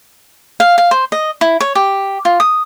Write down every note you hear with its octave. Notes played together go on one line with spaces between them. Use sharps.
F5
F5
C5
D#5
E4
C#5
G4
F4
D#6